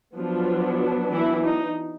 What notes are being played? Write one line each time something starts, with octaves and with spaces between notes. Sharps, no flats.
F3 F#3 B3 D4 F4
E3 E4
D#4